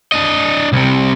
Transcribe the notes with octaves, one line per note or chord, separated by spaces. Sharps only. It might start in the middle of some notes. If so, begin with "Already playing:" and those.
D4 D#5
C2 C3